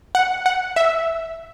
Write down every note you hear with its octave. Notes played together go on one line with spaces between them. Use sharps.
F#5
F#5
E5